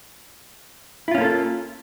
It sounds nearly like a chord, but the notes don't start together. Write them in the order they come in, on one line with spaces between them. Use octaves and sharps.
E4 F4 C#4 A#3 A4